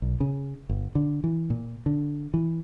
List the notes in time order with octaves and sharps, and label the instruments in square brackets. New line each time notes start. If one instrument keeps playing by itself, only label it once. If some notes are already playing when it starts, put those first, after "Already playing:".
[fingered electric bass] B1
C#3
G1
D3
E3
A#2
D3
E3